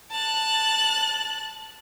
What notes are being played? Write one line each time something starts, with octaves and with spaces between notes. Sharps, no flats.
A5 F#6